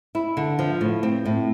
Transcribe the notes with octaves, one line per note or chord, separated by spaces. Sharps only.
E4
D3
F3
A2
C4
A2